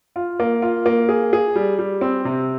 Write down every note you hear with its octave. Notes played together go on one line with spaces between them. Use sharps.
F4
A#3
F4
A#3
G#4
G#4
G3
G3
C4
C3